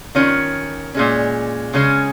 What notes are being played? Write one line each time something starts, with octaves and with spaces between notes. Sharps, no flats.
D#3 C#4 F4 C#5
A#2 G#3 C#4
C#3 G#3 C#4 G#4